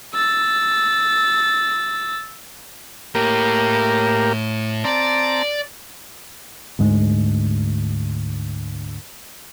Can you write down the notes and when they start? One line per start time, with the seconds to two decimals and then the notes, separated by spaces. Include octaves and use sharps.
0.14 E6 A6
3.15 A2 A#3 G4 A#4
4.84 C4 D5 A5 A#5
6.79 D2 G#2 G#3